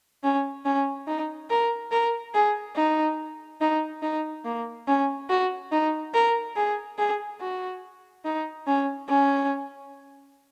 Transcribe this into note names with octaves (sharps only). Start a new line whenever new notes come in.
C#4
C#4
D#4
A#4
A#4
G#4
D#4
D#4
D#4
A#3
C#4
F#4
D#4
A#4
G#4
G#4
F#4
D#4
C#4
C#4